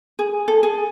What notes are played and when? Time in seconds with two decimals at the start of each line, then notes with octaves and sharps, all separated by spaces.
0.19 G#4
0.48 A4
0.63 G#4